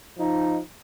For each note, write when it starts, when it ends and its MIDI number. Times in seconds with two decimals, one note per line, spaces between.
0.18 0.58 53
0.18 0.58 63